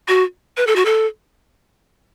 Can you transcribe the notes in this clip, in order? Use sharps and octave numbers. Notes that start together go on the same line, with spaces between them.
F#4
B4
A4
F#4
A4